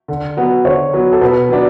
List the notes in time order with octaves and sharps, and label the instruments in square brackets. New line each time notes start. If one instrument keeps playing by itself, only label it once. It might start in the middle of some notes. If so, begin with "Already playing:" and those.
[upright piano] D3
F#3 B3
[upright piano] D3 [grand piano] C#5
[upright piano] F#3 B3
[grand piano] A4
[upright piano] B2 [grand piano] B4
[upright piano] F#3 B3 D4